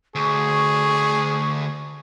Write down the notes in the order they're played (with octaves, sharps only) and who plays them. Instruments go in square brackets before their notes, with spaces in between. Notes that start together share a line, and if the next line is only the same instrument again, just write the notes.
[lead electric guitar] D2 [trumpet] G#4 [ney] C#6